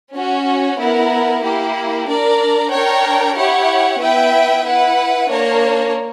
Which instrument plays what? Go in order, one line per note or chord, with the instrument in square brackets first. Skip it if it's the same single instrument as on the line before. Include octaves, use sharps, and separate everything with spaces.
[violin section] C#4 F#4 C#5
B3 E4 A#4
A#3 E4 G4
D4 A#4 D5
D4 A#4 C#5 G5
E4 G4 C#5 F#5
B3 E4 B4 E5 G5
E4 B4 F#5
A#3 D4 A#4 C#5